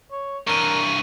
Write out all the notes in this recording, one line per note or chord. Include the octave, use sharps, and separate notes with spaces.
C#5
G2 E3 A#4 C#6 D#7